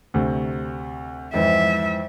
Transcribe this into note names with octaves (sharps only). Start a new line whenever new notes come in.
D2 C3
F2 G#2 E3 E5